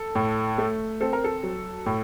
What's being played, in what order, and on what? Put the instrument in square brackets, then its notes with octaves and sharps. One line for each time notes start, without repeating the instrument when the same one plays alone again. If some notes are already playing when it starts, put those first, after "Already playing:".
Already playing: [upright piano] A4
A2
A3
C4 A4
A#4
A4
F#3
A2